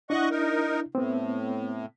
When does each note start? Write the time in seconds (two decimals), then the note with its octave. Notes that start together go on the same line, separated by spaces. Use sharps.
0.10 D4 E4 D#5 F#5 C#6
0.31 D#4 A#4
0.95 A2 B3 C4